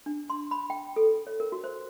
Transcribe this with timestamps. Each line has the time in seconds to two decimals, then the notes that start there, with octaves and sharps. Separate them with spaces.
0.06 D4
0.30 C6
0.51 B5
0.70 G5
0.96 A4
1.27 C#5
1.40 A#4
1.52 F#4
1.64 C5